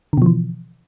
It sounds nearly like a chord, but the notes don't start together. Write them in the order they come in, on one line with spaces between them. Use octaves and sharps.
D3 B2 F3 E3